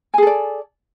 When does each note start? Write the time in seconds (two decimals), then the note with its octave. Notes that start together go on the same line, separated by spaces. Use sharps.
0.14 G#5
0.18 G#4
0.22 A4
0.27 D5